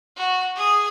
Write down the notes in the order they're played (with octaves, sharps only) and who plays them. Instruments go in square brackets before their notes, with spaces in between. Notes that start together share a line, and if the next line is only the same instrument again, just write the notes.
[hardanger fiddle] F#4
G#4 D#6